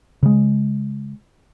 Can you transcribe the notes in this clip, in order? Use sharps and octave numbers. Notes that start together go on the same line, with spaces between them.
C#3 G#3